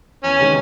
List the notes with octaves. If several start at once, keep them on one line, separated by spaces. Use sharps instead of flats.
E2 C#4
C3 D#3 G#3